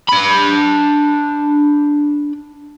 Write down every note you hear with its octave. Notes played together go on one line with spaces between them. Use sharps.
D4 B5